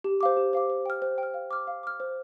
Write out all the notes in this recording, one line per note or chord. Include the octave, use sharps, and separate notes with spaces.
G4
C5 F5 D6
G4
C5 F5 D6
C5
G5 F6
C5
G5 F6
F5
D6 F6
F5
D6 F6
C5